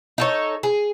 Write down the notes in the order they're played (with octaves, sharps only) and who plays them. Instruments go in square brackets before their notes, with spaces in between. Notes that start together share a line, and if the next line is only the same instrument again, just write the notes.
[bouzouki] D#4 A4 C#5
G#4